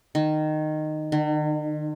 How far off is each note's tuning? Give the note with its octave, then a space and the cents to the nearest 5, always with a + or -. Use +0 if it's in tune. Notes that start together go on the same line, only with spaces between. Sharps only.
D#3 -15
D#3 -45